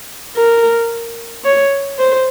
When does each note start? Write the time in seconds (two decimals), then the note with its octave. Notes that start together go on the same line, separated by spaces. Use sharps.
0.36 A#4
1.45 C#5
1.98 C5